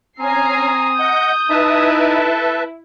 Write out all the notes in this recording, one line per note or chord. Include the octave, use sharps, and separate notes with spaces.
C4 C#4 G#5 A#5 D#6 C7
D#5 F#5 G6
D#4 E4 B4 E5 A5
A4